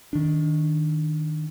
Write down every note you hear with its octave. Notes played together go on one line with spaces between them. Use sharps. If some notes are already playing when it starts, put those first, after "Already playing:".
D#3 D4